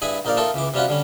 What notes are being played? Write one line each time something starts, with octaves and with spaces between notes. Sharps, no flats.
G2 E4 G#4 G#5 B5
A#1 D#4 A#4 D5 F5
A3 D#4 F4 A4 A#4
C#2 E3 D6
C3 G3 C#4 F4 F#4
D3 G3 C#4